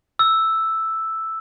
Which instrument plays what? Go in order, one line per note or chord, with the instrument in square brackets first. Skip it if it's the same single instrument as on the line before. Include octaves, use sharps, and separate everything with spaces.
[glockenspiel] E6